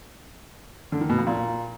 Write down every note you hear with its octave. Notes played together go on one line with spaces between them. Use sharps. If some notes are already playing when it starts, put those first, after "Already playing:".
D3
D#3
B2
F2
A#2